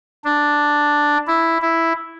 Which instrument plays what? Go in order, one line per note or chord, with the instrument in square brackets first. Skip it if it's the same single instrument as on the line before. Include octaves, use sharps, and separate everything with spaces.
[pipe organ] D4
E4
E4